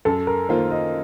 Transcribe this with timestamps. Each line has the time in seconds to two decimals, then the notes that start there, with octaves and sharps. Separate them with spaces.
0.05 F#2 A4
0.27 A#4
0.48 D#3 A#3 F4 C5
0.71 D#5